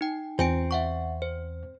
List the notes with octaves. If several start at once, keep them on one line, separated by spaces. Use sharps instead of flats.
D#4 G5
E2 C4 F4 G#5 D7
E5 F#5 C#6
C5